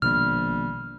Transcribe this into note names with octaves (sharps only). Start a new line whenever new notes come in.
A#1 B2 D#3 G3 B3 F6